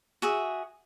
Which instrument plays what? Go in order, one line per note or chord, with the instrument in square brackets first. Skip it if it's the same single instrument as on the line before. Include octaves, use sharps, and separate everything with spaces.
[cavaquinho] F#4 G#4 E5